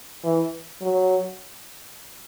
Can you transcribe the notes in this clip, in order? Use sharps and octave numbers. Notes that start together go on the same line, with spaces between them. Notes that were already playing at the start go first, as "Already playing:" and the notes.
E3
F#3